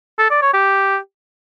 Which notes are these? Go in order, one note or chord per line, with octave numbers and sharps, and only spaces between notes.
A4
D5
C#5
G4